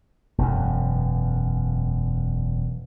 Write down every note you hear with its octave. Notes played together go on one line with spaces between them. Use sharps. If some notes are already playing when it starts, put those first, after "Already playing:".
E1 F#2